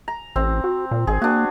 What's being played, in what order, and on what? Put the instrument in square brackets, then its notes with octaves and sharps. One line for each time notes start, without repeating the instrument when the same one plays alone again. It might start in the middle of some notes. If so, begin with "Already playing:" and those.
[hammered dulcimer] A#5
[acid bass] A1 [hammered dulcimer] C4
[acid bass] F#4
A#2
[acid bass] G#1 [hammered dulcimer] G#4
[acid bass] A#3 [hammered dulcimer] D4 F#4